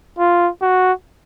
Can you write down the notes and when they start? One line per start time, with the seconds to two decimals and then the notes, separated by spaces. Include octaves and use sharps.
0.19 F4
0.62 F#4